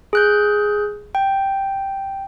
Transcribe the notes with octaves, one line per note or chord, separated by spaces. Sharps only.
G#4 F#6 G6
G5